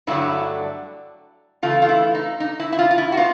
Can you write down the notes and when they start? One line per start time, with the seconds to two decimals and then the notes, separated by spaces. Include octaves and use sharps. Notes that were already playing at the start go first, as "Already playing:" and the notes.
0.07 G2 D3 F#3 A3 E4
1.62 C#3 E3 A3 F4
1.82 F4
1.89 E4
2.15 D#4
2.40 D#4
2.60 E4
2.72 E4
2.79 F4
2.91 F4
2.98 E4
3.12 F#4
3.17 B3 D#4 F4